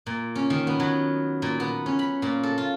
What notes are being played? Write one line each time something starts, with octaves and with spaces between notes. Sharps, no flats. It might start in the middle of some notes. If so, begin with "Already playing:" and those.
A#2
C#4
D#3
B3
F#3
A#2
B3
C#4
B5
A#2
A4
F4